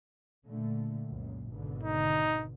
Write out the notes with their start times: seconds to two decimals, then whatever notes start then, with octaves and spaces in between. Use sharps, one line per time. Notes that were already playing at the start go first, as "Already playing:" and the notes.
0.45 A#2 D3 A3
1.07 C#2 F#2 A#2
1.51 G#1 B2 D3
1.83 D#4